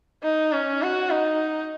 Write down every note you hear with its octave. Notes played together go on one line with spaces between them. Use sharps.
D#4
C#4
F#4
D#4